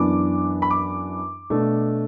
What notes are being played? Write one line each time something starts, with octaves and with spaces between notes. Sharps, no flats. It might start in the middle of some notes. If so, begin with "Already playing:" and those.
Already playing: F#2 E3 B3 D4 D6
B5
D6
B2 A3 D4